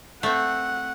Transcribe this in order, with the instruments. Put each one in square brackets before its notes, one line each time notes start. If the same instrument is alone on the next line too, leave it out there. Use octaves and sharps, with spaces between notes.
[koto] A3 C4 [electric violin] F#5